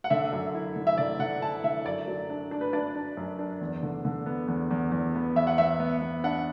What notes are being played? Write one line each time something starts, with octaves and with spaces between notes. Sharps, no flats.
F#5
D3 E5
F#2
E4
D3
E5
D3 D5
D3 F#5
E4 A5
D3 E5
F#2 D5
F#3
D4
D4
B4
D4 D5
D4
F#2
D4
E2
D3
D3
B3
E2
E2
E2
B3
E2 E5
F#5
E2 E5
B3
B3
D4 F#5